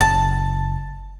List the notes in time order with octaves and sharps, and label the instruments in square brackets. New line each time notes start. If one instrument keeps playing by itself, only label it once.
[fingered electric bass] F#1 [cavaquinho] A5